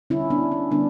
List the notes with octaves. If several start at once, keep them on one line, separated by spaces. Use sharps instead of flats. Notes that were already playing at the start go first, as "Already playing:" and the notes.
D3 G3 C#4 E4
B3 D4
C#4
D3 G3 B3 D4